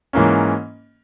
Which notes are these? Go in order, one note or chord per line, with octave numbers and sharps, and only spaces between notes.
G#2 E3 A#3 C#4